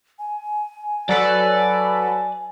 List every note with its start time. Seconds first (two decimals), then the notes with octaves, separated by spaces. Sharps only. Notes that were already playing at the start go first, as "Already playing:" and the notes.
0.19 G#5
1.09 F#3 A4 B4 D5